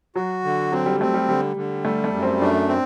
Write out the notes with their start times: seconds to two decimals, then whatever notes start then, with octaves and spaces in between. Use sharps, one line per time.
0.15 F#3 F#4
0.44 D3
0.72 F#3 C4
0.86 G3
1.00 A3 C4
1.14 G3
1.29 D3 G3
1.56 D3
1.85 G3 A3
2.04 A3
2.13 F#2
2.23 C4
2.41 A3 D4
2.69 C4